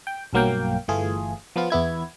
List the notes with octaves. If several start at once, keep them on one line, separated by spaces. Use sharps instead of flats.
G5
B1 G2 F#3 A#3 F5 G5
G1 E3 A3 F4 G#4
F3 B3 F4
E2 B3 E4 G#6